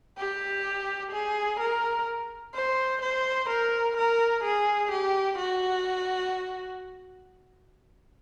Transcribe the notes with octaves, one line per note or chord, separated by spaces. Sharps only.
G4
G#4
A#4
C5
C5
A#4
A#4
G#4
G4
F#4